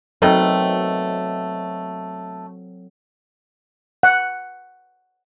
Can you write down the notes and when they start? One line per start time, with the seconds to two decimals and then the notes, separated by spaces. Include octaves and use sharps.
0.22 B2 D#3 F#3 A3 C4 A4
4.03 F#5